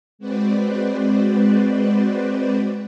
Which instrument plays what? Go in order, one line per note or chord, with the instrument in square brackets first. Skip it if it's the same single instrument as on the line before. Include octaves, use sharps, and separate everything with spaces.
[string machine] G#3 C4 F#4 B4 C5 D5